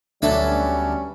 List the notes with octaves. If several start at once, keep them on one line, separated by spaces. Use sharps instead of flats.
D2 F#3 G3 B3 C#4 D4 A4 E5